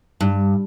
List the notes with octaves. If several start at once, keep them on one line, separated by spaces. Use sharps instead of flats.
G2